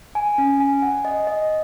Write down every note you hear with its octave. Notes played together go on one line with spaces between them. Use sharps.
G#5
C#4
G#5
F#5
D#5
D#5